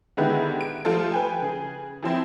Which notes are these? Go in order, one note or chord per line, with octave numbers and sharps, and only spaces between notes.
D3 D#3 G#3 B3 E4 G4
D7
F3 G3 A3 F4 A4
B4 G5 G#5
C#3 G#4
E3 F3 C4 E4